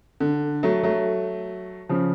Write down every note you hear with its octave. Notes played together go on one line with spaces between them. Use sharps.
D3
F#3 A3
F#3 A3
C#3 F3